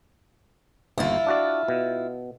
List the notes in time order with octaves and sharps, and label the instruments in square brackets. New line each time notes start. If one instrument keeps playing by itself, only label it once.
[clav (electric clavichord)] G1 D#2 [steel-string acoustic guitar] E4 F4
[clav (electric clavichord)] D4 F#4 D5
B2